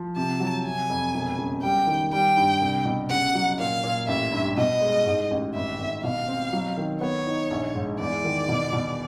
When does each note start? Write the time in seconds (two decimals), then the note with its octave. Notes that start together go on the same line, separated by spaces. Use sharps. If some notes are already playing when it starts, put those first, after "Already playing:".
Already playing: F3
0.16 C3 A5
0.40 F#3
0.65 C3 G#5
0.89 F2
1.14 E1
1.38 C#3
1.63 G3 G5
1.87 D#3
2.12 G3 G5
2.37 G2
2.61 C2
2.85 B2
3.09 C#3 F#5
3.35 F#3
3.58 A#2 F5
3.84 A#2
4.07 A1 E5
4.32 G2
4.57 B2 D#5
4.81 G#3
5.06 G#2
5.31 A1
5.54 G#1 E5
5.79 G#1
6.03 B2 F5
6.28 C4
6.53 F#3
6.77 D#3
7.01 B3 C#5
7.27 D#4
7.51 A#1
7.75 G#2
8.00 E2 D5
8.24 D#3
8.48 B2
8.72 B2